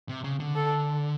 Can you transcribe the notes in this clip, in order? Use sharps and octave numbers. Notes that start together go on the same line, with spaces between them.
C3
C#3
D3
A4